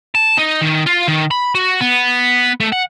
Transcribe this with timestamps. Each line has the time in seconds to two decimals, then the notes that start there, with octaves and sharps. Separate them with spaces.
0.15 A5
0.38 D#4
0.62 D#3
0.86 F4
1.08 D#3
1.31 B5
1.55 F#4
1.81 B3
2.60 A3
2.72 F#5